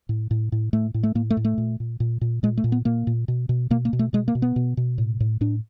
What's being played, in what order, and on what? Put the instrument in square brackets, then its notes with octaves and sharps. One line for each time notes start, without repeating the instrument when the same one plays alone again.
[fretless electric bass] A2
A2
A2
A2 A3
A2
A3
A2 A#3
A3
A2
A3
A#2
A#2
A#2
A#2
A#2 G#3
A3
A#2
B3
A#2 A#3
A#2
B2
B2
B2 A#3
A#3
B2
A3
B2 G#3
A#3
B2
B3
B2
B2
A2
A2
A2 D4